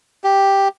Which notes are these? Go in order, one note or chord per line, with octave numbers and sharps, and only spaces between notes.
G4